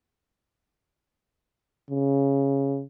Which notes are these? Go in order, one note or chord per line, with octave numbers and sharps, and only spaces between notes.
C#3